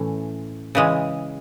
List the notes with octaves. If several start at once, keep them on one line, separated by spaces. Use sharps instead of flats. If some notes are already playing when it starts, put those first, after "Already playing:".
Already playing: A2 E3 A3 C#4
C#3 E3 G#3